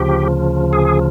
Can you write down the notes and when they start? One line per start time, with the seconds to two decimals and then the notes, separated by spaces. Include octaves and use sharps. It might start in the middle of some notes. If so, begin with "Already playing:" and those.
Already playing: D2 C#3 F3 G4
0.73 G#4